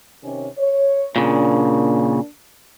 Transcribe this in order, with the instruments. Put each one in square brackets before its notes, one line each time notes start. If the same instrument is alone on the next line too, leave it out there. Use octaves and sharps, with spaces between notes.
[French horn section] C3 D#3 C#4
C#5
[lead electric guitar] A#2 C#3 [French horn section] A#3 D4